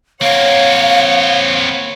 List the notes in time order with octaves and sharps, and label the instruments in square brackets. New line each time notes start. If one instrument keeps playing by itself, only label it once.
[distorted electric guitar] A#3 C4 [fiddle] C#5 F#5 [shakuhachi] F5